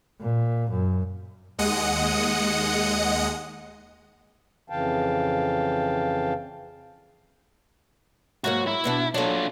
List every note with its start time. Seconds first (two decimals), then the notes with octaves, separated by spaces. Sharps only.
0.20 A#2
0.71 F#2
1.58 D#2 G#3 D#5 F#5 D#6 C#7
4.70 F2 C#3 E3 F5 G5 A5
8.44 G#2 F#3 A#3 F#4
8.67 E4
8.84 B2 B3 D4
9.14 F#3 D4 F4 A4